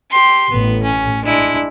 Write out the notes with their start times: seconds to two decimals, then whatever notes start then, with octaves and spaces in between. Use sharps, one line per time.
0.10 G4 C6
0.50 A1 A2 B3
0.83 C#4
1.24 G#3 D4 E4